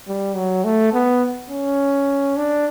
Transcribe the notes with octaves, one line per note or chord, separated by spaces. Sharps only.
G3
F#3
A3
B3
C#4
D4